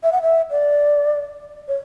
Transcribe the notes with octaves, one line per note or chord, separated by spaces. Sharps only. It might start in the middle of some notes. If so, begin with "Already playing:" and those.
E5
F#5
E5
D5
C#5